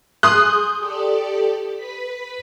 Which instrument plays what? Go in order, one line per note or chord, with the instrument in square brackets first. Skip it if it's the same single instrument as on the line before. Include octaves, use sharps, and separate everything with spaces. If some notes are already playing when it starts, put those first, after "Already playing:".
[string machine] G#4 G6 [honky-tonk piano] C6 D#6 F#6
[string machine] G4 A4 D5
B4 B6